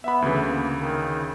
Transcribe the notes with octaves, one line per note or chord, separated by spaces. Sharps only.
B3 E5 B5
D2 C#3 E3
A#3
D#3